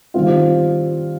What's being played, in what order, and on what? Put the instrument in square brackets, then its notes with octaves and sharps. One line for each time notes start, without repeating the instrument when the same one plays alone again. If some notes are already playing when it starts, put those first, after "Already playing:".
[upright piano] D#3 G3 C4 F4